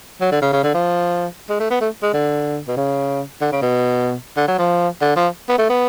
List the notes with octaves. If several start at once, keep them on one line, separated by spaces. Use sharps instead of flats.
F#3
D3
C#3
C#3
D3
F3
G#3
A3
B3
A3
G#3
D3
B2
C#3
D3
C#3
B2
D3
F#3
F3
D3
F3
B3
A3
B3